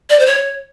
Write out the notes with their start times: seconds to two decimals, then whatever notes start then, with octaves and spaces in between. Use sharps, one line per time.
0.10 D5
0.19 C5
0.26 C#5